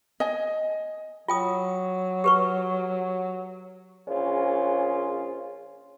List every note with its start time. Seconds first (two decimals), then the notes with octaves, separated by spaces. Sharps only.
0.20 D#5 G#5
1.28 F#3 F4 G5 D#6
2.24 G4 B4 C#6
4.08 A#1 C#4 F4 G#4 C5